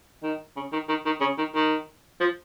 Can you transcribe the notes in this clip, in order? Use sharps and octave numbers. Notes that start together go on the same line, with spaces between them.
D#3
C#3
D#3
D#3
D#3
C#3
D#3
D#3
F3